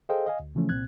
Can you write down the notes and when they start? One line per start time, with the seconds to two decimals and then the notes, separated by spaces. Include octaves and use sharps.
0.09 G#4 A4 C5 D#5 F5 G5
0.26 D#5 F5 G#5
0.40 D2
0.55 C#3 E3 F3 A3 C#4
0.69 C2 A#2 C4 F#6 G#6